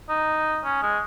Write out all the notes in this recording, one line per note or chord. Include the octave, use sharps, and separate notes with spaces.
D#4
C#4
G#3